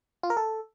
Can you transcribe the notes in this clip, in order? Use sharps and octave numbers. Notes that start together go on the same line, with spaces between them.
F4
A#4
A4